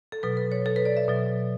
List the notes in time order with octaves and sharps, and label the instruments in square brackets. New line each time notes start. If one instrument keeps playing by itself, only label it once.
[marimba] A4
B2 F#3 B4
B4
C#5
A4
B4
D5
E5
B2 F#3